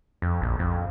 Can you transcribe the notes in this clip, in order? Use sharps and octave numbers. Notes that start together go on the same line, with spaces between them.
F2
A#1
F2